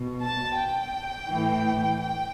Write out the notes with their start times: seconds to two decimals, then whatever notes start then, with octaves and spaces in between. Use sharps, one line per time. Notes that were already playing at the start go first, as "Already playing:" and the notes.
Already playing: B2
0.22 A5
0.58 G5
1.28 A2 E3
2.00 G5